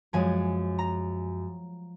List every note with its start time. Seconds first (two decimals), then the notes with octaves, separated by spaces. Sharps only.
0.13 F#2 F3 G#3 G#5
0.79 A#5